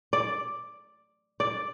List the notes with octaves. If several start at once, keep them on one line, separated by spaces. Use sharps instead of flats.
D5
D5